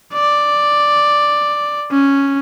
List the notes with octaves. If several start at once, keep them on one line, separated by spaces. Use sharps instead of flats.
D5
C#4